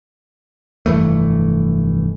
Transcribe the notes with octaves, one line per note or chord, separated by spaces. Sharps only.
F1 G2 E3 A3